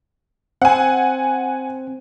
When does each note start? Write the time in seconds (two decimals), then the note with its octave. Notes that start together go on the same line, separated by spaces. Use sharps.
0.62 C4 F#5 G#5